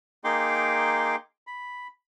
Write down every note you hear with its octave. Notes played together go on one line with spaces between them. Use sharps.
A#3 D#4 G#4 G5 C6 D6
B5